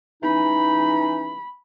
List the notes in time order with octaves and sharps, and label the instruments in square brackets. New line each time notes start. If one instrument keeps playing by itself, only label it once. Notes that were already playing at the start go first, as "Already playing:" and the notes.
[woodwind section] E3 C#4 D#4 [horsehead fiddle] B5